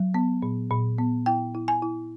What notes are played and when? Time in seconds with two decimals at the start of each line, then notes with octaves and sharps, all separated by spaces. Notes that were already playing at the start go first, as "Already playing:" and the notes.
Already playing: F#3
0.14 B3
0.42 A#2
0.71 A#2
0.98 B3
1.26 E4 G5
1.55 E4
1.68 G#5
1.82 E4